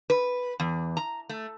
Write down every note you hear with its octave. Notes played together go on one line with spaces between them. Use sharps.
B4
E2
A#5
A3